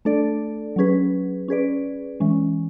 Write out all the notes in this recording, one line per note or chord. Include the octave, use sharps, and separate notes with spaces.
A3 D4 A4 D5
F#3 C#4 G#4 B4
C#4 G#4 B4 D5
E3 G#3 C#4